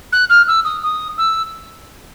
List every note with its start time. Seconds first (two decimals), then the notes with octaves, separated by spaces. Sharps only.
0.12 F#6
0.30 F6
0.48 E6
0.65 D#6
0.83 D#6
1.18 E6